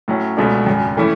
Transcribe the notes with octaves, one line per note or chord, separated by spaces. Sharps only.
A2 F#3 C#4
C#2 B2 F#3 A3 D4
G#1 F#2 C#3
E3 A3 C#4 E4